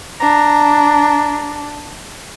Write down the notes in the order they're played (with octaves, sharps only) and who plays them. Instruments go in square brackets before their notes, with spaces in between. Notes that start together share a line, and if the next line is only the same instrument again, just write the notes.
[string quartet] D4 [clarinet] A#5